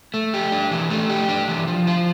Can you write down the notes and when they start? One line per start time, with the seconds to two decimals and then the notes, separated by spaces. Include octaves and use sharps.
0.14 A3
0.34 G4
0.52 D4
0.71 E3
0.90 A3
1.09 G4
1.29 D4
1.48 E3
1.67 F3
1.87 F4